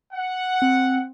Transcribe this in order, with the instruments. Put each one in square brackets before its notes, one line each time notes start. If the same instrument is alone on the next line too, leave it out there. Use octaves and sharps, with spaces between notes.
[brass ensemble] F#5
[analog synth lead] C4